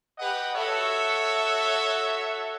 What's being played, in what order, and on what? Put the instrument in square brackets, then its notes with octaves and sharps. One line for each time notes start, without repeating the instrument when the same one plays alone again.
[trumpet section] G4 B4 D#5 F#5
F#4 A4 C#5 E5